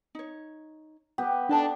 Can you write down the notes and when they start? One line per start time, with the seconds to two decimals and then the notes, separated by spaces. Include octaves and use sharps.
0.15 D#4 C#5
1.18 B3 G4
1.49 D4 D#4 A4 A5